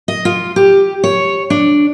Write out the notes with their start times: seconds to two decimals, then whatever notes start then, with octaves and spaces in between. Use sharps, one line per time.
0.08 D#5
0.25 F4
0.56 G4
1.04 C#5
1.50 D4